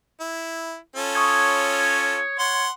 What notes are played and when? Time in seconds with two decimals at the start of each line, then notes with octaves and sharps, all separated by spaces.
0.20 E4
0.96 C#4 F4 A4
1.15 C#5 C#6 D#6 G#6
2.39 C#5 F#5 C6